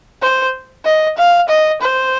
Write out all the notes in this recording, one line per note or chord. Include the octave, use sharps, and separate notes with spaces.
C5
D#5
F5
D#5
C5